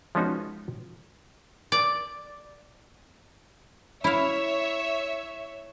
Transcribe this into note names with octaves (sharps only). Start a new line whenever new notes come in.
F3 G#3 B3 C#4 D#4 F#4
D5
E4 C#5 E5 F5